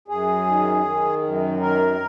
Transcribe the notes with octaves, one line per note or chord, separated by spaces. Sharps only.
F#2 G#4
D#3
D#3
F#2
D#3 A#4